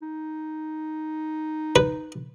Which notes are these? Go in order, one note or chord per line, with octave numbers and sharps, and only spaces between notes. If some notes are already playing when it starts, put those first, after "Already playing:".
D#4
B4